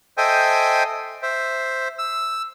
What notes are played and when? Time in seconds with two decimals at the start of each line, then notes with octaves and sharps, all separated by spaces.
0.18 A4 C5 D#5 E5 G5 G#5
1.23 C5 E5
1.99 E6